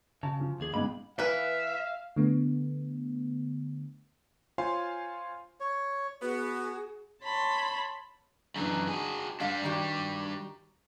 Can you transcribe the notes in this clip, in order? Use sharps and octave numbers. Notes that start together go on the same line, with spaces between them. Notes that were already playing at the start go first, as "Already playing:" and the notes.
C#3 A5
F3
D#2 G#4
C#2 G#2 B2 A#3 B5
E3 B4 E5 F5
D3 A3 B3
F4 C5 C#5 F5 G#5 C6
C#5
B3 F#4 G#4
C#5 A5 B5 C6
F#2 E3 G#3 D4 D#4
F#4 G#4
G3 G#3 D4 F5
D#3 F#4 G4